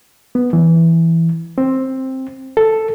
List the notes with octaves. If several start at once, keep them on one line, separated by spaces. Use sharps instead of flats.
B3
E3
C4
A4